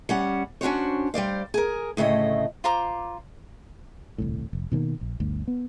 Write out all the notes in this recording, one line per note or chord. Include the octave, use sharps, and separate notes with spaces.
G3 C#4 F#5
C#4 D4 F#4 C5 C#5
G3 C5 D5 F5
G#4 A#4
D2 A2 C#3 A3 D#5
F4 C5 A#5 D6
D#1 C2 A2
F1
B2 D#3 G3 A#3
A#1
G1 D2
B3